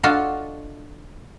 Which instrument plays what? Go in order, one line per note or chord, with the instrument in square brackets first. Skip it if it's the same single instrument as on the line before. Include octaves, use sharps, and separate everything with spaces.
[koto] D4 F4 F#4 A4 D#5 F5